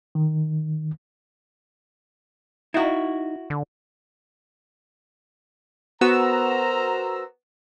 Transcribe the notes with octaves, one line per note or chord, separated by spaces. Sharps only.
D#3
D#4 E4 F#4
D3
B3 F#4 A#4 C5 A#5 E6